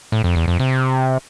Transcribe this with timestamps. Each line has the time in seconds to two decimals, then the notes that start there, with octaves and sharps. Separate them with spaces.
0.12 A2
0.24 F2
0.36 E2
0.48 F2
0.60 C3